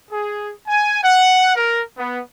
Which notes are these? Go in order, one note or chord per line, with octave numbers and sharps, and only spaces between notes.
G#4
G#5
F#5
A#4
B3